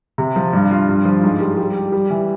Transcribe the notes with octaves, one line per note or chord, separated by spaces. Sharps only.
C3
F3
G2
F4
G2
F3
G#2
G3
G3
G4
G3
E3